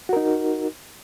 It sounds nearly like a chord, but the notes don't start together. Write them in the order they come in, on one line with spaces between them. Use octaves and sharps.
F#4 A#4 D#4